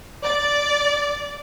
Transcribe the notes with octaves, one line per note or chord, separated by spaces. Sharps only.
D5